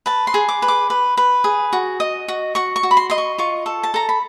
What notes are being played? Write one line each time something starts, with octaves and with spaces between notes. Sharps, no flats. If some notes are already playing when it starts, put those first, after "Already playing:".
B4 A5
C6
G#4
D6
B4
D6
B4
B4
G#4
F#4
D#5
F#4
F#4 C#6
C#6
F#4
B5
C6
D#5 C6
C#6
F4 C#6
A4
A5
A4 A#5
B5